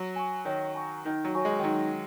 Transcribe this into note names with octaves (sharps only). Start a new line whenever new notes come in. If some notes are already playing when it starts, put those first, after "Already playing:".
Already playing: F#3
G#5 C#6
D#3 C#5
G#5 C#6
D#3 D#4
F#3
F#4 C#5 G#5 C#6
G#3
D#3
F#3 D#4